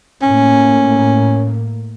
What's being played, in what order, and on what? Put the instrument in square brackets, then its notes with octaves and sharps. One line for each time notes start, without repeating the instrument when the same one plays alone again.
[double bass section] A2 A#3 [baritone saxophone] C#4